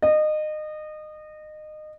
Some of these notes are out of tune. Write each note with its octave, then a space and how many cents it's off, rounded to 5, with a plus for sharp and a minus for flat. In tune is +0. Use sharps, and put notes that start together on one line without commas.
D#5 -25